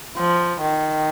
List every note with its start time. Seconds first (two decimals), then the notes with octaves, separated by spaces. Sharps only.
0.17 F3
0.62 D#3